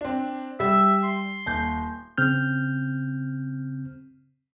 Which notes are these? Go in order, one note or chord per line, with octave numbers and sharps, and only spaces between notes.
C4 D4
G3 E5
C6
D#1 G6
C#3 C4 F6 G6